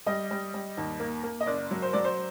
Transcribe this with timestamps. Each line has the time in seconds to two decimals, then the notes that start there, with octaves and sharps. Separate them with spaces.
0.06 G3 D#5
0.31 G3
0.54 G3
0.77 D#2
1.00 A#3
1.23 A#3
1.40 D#5
1.46 F#1 D5
1.71 F#3
1.82 C5
1.93 F#3 D5
2.05 C5